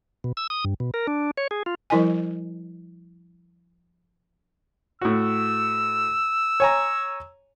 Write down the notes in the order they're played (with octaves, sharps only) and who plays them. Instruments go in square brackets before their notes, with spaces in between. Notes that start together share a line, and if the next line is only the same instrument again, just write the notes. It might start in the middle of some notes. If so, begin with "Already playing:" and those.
[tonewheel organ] B2
E6
D#6
G2
B2
A#4
D4
C#5
G#4
F4
[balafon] F3 G3 E4 A#4 D#5 G#5
[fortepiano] A2 F#4 [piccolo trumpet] E6
[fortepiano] C#5 G#5 A#5